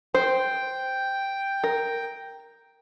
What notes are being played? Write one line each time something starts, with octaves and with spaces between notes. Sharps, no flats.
C5 G5
A#4